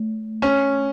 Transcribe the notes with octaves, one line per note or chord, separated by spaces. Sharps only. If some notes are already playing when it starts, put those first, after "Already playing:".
Already playing: A3
C#4